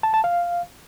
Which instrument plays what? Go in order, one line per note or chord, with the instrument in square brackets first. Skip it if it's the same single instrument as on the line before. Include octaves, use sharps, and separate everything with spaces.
[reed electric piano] A5
A5
F5